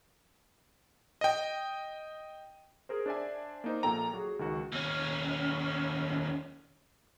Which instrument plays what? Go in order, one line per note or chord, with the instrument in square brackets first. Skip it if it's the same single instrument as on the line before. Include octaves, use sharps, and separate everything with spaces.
[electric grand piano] D#5 G5
G#4 A#4 C5
D4 C5 D5 E5 G#5
A#3 D#4 C5
A#1 A#2 A#3 A4 G5 A#5
F#3 F#4 G#4
C#2 D#3 F#4
[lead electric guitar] D#2 C#4